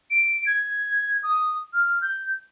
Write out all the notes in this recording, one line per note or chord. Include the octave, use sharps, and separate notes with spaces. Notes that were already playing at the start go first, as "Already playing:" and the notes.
D7
G#6
D#6
F6
G6